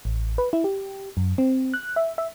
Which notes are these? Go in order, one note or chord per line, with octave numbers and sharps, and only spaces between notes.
A1
B4
E4
G4
F#2
C4
F#6
E5
E5